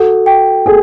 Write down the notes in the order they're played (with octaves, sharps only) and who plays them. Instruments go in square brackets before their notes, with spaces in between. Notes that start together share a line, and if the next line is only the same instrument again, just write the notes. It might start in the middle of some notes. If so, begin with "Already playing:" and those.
Already playing: [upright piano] F#4 [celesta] A4
[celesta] G5
[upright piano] G#4 [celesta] A4